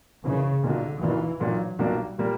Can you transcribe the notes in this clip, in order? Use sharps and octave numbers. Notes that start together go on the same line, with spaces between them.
F#1 F#2 C#3 E3
B1 A#2 D3 A#3 D4 F#4
B1 A#2 E3 A#3 D4 F#4
B1 A#2 F#3 A#3 D4 F#4
B1 A#2 G3 A#3 D4 F#4
A#2 G3 A#3